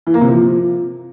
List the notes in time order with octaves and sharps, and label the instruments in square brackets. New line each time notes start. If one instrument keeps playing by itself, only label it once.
[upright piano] E3
A#3
C3
F3